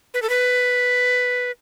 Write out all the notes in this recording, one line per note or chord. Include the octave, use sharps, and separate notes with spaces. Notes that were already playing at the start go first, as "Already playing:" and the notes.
B4
A4
B4